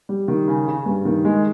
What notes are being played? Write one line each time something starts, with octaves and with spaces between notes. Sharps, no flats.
G3
D#3
C#3
C#3
G2
D#3
G#3